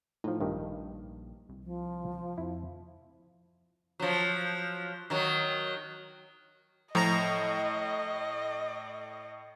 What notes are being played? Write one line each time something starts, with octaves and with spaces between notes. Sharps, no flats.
A2 F3 D#4
A#1 G2 D#3 G4
C2
F3
F2 E4
F3 F#3
D#3 F#3
A2 F3 D#5 A#5 A#6